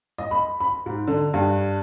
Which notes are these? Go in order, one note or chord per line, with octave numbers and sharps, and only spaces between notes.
D#5
B5
B5
G#2
D3
G2